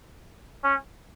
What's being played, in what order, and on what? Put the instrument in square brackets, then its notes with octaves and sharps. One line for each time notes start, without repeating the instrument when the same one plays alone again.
[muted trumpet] C#4